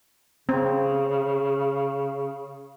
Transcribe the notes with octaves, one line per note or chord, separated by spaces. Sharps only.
C#3 C4